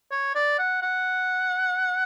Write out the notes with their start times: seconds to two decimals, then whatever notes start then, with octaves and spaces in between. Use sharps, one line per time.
0.12 C#5
0.35 D5
0.59 F#5
0.82 F#5